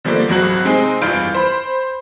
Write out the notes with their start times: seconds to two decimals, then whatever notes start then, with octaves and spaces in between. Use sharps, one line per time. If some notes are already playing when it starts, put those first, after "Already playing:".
0.05 D3 F3 G3 A3 A#3
0.28 G#1 C#2 F#3 F#4 F#7
0.65 C3 G#3 C4 D#4
1.02 F1 G2 E3 F4 G6 D7
1.35 C5 B5